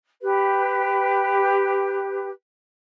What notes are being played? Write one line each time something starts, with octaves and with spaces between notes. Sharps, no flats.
G4 B4